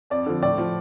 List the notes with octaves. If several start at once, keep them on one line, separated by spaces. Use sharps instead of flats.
F2 D5
D3 F3
A2 D5
F3